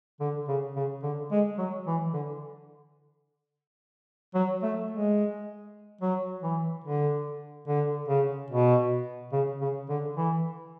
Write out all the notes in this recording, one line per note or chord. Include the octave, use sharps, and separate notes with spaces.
D3
C#3
C#3
D3
G#3
F#3
E3
D3
F#3
A3
G#3
F#3
E3
D3
D3
C#3
B2
C#3
C#3
D3
E3